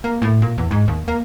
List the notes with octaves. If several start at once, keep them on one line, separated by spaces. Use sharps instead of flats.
A#3
A2
A#2
E2
G#2
D#2
A#3